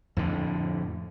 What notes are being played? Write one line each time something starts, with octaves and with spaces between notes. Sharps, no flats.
F2 A2 D3